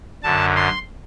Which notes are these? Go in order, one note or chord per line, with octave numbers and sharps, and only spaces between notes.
F#2 D3 A5
C6